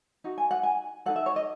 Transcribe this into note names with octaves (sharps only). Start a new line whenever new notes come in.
D#4 F#4
G#5
F#5
G#5
D#4 A4 F#5
E5
C#5
D#5